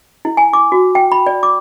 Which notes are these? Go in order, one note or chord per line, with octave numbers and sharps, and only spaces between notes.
E4
G#5
D6
F#4
G5
B5
D5
D6